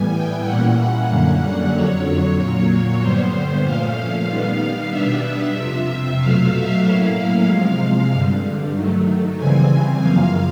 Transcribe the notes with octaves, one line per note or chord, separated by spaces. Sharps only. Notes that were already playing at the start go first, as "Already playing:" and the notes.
Already playing: A2 E3 G3 B3 G#5
G5
A#2 G3 A#3 C#4 E4 F#5
F#2 D3 G3 A#3 C#4
F2 D3 F#3 C#5
A#2 F#3 A#3
G2 D3 G3 B3 C5
A#2 F3 A3 C#4 F5
D#3 G3 B3 F5
B2 G3 B3 D4 E5
F2 C3 F3 E5
B2 F#3 A3 F5
E5
A2 F#3 A#3 C#4 E4 F5
C3 F3 G#3
G2 D3 G3
D#3 F#3 A3
C#3 E3 G3 C4 G#5
F#2 C#3 F3 A#3 F5